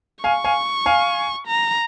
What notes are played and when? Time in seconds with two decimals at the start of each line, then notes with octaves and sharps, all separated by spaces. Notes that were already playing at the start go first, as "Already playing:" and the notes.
0.24 F5 G#5 C#6
0.45 F5 G#5
0.86 F5 G#5
1.47 A#5